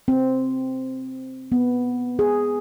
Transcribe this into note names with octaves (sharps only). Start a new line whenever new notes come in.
C4
B3
G#4